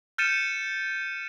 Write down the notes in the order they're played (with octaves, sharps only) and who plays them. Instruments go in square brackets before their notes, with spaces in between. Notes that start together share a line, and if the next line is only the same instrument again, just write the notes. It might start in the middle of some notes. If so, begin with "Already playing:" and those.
[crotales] F6 G6 A6 C#7 D#7 E7